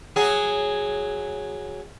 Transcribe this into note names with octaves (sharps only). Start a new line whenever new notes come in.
F#3 G#4